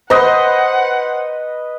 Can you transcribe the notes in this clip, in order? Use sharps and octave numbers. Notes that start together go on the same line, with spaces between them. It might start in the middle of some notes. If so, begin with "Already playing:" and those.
B4 C5 D#5 F#5